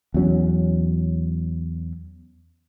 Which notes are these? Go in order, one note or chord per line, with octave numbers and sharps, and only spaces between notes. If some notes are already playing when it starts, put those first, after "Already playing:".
E2 F#3 C#4